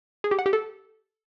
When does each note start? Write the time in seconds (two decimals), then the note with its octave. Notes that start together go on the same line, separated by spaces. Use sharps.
0.24 G#4
0.31 G4
0.39 F#5
0.46 G4
0.53 A4